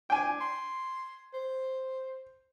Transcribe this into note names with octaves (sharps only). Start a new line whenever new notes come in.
D4 G5 G#5
C6
C5